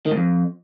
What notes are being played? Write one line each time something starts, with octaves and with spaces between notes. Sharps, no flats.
D#3
G#2
F2